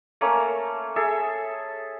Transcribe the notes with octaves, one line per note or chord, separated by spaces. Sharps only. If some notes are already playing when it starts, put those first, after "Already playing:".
A3 A#3 C#4
G#4 A4 E5